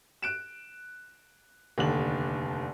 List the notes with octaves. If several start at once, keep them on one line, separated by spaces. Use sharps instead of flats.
F#6 D7 E7
F1 D#2 D3 D5 F#7